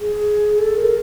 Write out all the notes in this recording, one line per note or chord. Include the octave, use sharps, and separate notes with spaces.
G#4
A4
A#4